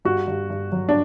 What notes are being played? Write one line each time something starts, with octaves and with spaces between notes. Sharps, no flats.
G2 F#4
G2
G2
F#3
D4